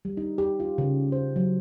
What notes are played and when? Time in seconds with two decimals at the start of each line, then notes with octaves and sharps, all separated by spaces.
0.05 G3
0.17 D#4
0.38 G4
0.60 F4
0.78 C#3
1.12 C5
1.36 F#3